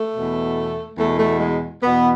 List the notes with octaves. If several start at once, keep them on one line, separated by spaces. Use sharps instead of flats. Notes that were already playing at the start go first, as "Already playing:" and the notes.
Already playing: A3
E2 B2
E2 B2 A3
A3
G#3
E2 B2 B3